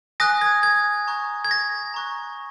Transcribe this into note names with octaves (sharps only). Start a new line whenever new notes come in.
G#5 D#6 F#6 A#6
G#6
G#6
A#5 C#6 F#6
G#6
A#6
A#5 C#6 F#6